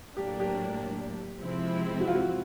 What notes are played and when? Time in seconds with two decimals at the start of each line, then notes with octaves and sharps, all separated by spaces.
0.16 A2 F#3 A#3 D4 G4
0.40 G4
1.38 C3 F3 G#3 C4 E4
2.00 F#4
2.07 F4
2.15 F#4